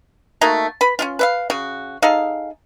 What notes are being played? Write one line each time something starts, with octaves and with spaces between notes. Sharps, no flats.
A3 A#3 D#4 F#4
B4 B5
C#4 D4 F4
B4 E5 F5
C#3 F#4
D#4 G#4 A4 F5